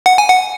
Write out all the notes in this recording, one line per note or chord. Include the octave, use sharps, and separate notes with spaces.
F#5
G#5
F#5